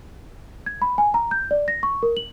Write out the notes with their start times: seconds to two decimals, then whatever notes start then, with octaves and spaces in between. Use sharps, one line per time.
0.66 G#6
0.82 B5
0.98 G#5
1.14 A#5
1.31 G6
1.51 D5
1.68 A#6
1.83 C#6
2.03 A#4
2.17 F#7